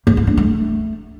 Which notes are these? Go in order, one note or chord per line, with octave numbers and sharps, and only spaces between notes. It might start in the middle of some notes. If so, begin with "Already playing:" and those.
A#3
A#3
D4
A3